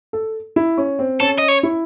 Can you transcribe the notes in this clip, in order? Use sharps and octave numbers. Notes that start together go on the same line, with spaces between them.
A4
E4
C#4
C4
C#4 A4
D#5
C#5
E4